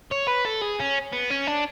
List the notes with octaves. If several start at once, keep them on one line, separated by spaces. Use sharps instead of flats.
C#5
B4
A4
G#4
C#4
B3
C#4
D4